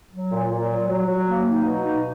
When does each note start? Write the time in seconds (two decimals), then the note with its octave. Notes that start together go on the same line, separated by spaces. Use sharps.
0.11 F#3
0.31 A#2
0.50 A#2
0.69 F#3
0.89 F#3
1.07 F#3
1.26 A#3
1.46 D#4
1.64 B2
1.84 D#4